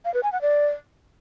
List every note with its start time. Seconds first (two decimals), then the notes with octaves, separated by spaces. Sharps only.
0.05 F5
0.14 B4
0.23 G#5
0.32 F#5
0.42 D5